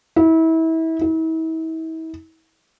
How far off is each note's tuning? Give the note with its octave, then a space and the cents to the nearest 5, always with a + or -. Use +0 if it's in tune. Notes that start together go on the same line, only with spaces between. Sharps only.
E4 -30
E4 -40